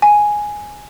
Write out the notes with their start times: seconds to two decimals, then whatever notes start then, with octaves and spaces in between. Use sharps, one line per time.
0.02 G#5